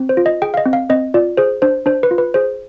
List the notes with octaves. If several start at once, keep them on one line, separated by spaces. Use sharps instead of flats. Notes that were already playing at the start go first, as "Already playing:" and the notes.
Already playing: C4
C5
F4
D#5
G#4 G5
F5
D#5
C4
F5
C4 D#5
F4 D5
G#4 C5
D4 C5
D4 C5
B4
F4
B4
G#4 C5